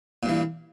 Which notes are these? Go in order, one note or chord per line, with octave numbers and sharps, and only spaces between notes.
G2 A#2 E3